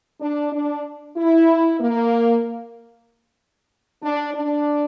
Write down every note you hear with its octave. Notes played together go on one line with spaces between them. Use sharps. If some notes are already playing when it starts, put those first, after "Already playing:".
D4
D4
E4
A#3
D4
D4